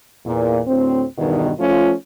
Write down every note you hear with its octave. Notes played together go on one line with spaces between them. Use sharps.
E2 A#2
D2 A2 C4
E2 G2 B2 D#3
F3 A3 C#4 F4